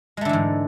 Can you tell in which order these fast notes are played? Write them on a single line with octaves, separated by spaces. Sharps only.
G#3 A3 D3 E3 G#2